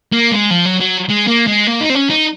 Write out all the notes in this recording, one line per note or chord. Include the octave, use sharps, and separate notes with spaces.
A#3
G#3
F3
F#3
F#3
G#3
A#3
G#3
A#3
D#4
C4
C#4
D#4